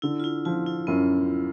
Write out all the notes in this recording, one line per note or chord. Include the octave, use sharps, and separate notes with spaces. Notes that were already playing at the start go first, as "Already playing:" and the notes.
D3 E4
F4
E4
F3 F4
E4
F#2 B3